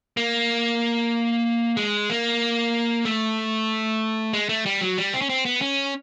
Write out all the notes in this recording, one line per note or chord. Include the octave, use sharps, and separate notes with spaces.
A#3
G#3
A#3
A3
G#3
A3
G3
F#3
G3
C4
C#4
C4
B3
C#4